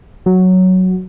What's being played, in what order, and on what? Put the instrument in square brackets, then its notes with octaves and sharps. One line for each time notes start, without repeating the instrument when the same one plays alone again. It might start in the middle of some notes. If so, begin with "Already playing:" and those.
[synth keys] F#3